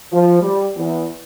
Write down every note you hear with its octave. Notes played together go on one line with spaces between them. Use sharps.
F3
G3
E2